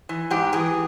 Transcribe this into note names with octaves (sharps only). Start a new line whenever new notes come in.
E3
G#2 G4
E3 G#4